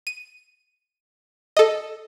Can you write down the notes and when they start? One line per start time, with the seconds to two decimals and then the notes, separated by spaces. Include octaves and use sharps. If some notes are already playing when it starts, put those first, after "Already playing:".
0.07 D#7
1.57 A4 D#5